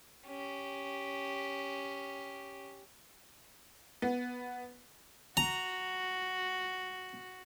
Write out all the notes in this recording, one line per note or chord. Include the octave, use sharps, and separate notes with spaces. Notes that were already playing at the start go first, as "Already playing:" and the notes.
C#4 G4
B3
F#4 A#5